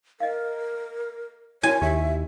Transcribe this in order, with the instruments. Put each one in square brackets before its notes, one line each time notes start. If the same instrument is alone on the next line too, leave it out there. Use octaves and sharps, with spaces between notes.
[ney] A#4 [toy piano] D#5 F5
[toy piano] E4 F#4 [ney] C#5 [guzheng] G#5
[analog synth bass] D#2 [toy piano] G4 [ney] E5